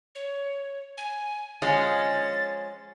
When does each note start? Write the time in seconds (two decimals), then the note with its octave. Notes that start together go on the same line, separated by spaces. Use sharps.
0.15 C#5
0.98 G#5
1.62 F3 G#3 C#4 A6